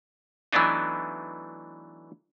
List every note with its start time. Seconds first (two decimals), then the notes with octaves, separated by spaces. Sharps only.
0.53 E3 F#3 A3 B3 D4 D#4